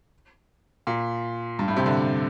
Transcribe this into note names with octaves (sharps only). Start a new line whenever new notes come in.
A#2
G2
A2
C3
D3